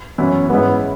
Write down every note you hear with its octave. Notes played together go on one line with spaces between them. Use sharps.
F#2 E3 B3 C#4 E4
G#2 G#3 B3 C#4 E4